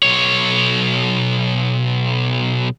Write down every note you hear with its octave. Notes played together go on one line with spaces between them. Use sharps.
B1 C#5